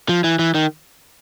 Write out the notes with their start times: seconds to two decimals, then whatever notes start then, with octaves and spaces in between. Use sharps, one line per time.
0.09 F3
0.24 E3
0.39 E3
0.54 D#3